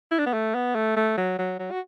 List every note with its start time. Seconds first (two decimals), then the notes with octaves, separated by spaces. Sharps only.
0.11 E4
0.19 D4
0.26 B3
0.34 A3
0.55 B3
0.75 A3
0.96 A3
1.17 F#3
1.38 F#3
1.59 F#3
1.71 F#4